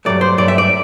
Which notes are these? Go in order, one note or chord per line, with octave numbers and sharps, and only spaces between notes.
G2 F#3 A3 D5
C5
G2 F#3 A3 D5
E5
D5